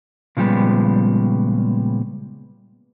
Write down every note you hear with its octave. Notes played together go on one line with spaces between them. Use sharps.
A#2 C#3 F3 G3 G#3 B3